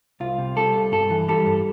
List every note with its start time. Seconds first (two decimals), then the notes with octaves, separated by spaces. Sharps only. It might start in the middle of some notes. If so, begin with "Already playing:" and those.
0.20 C2 F4
0.39 C3
0.56 G3 A4
0.75 C2
0.92 G2 A4
1.10 E3
1.28 G3 A4
1.46 G2